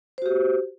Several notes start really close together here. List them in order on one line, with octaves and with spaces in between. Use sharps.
C5 F#4 G4